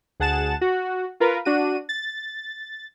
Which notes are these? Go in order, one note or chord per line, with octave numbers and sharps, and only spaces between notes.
D2 G#4 F#5 A5 A6 E7
F#4
F4 A#4 B4 F5
D4 F#4 D#7
A6